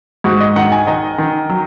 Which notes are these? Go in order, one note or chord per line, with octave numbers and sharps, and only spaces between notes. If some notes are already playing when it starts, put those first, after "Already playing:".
G#2 F#4
D#5
D#3 F#5
G#5
D#3 D#5
D#3
F#3